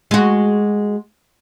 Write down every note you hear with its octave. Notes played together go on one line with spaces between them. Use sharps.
G#3 F#4